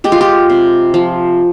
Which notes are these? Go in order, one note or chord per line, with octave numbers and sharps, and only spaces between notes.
G#3 G4
F4
G4
C3
F3